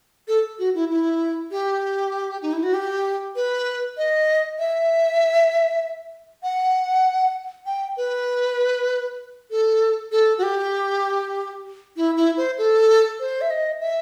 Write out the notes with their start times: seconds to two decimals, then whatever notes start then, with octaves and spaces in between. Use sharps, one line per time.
0.28 A4
0.59 F#4
0.75 E4
0.90 E4
1.51 G4
2.42 D#4
2.53 E4
2.63 F#4
2.74 G4
3.36 B4
3.97 D#5
4.59 E5
6.43 F#5
7.66 G5
7.97 B4
9.51 A4
10.12 A4
10.38 F#4
10.43 G4
11.97 E4
12.17 E4
12.37 C5
12.58 A4
13.20 C5
13.41 E5
13.50 D#5
13.80 E5